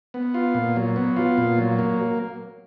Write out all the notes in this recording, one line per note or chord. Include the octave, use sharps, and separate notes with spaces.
B3
F4
A#2
F#3
B3
F4
A#2
F#3
A#3